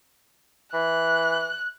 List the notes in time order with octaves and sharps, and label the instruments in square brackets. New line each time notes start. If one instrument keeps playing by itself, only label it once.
[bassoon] E3 [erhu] F#6